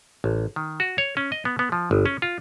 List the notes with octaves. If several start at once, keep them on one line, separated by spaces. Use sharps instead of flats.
A1
D#3
F#4
C#5
C#4
D#5
B3
B3
F3
G1
C#4
F4